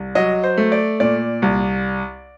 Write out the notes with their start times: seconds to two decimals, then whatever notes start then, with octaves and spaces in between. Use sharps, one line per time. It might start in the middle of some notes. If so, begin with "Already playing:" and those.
Already playing: C2
0.15 F#3 D#5
0.44 C5
0.57 A3
0.72 D5
1.00 A#2 D5
1.42 C2